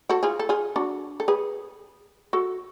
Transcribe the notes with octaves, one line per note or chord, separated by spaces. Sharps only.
F#4 A4
F4 G#4
A4
F4 G#4
D4 F#4
A4
G#4 B4
F#4 A4